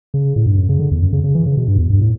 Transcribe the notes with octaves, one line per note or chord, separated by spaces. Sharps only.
C#3
A2
G2
F#2
C#3
D3
E2
F#2
C#3
C#3
E3
C#3
B2
G2
E2
G2
A2